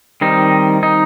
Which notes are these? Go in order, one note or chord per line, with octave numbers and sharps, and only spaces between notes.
D#3 G3 C4 D#4
D#4